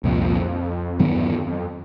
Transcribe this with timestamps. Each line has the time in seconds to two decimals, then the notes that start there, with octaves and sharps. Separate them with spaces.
0.04 C2 F2 A#2 F3
0.99 E2 G2 D#3 F#3 B3
1.14 E2
1.31 F2
1.46 F2